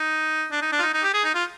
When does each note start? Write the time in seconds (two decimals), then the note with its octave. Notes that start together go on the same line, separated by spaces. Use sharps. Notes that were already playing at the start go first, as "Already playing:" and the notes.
Already playing: D#4
0.51 D4
0.62 D#4
0.72 D4
0.79 F4
0.82 D#4
0.94 D#4
1.03 G4
1.14 G#4
1.24 D#4
1.35 F4